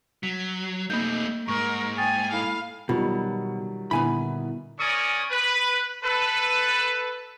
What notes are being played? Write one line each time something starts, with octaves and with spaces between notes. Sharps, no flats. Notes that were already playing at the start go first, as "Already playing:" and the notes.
F#3 B6
A3 A#3 D#4 G6
G#2 A#4 C#6
G5 G#5 D#6 A6
E4 A4 F5 B5
B2 D#3 F#3 G3 F4
A#2 D3 B3 E4 G#5 B5
C#4 A#4 D5 G#5 C#6 D#6
B4
A4 B4